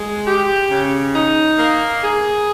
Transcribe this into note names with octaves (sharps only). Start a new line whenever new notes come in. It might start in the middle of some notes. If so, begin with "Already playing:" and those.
Already playing: G#3
G4
C#3
D#4
A#3
G#4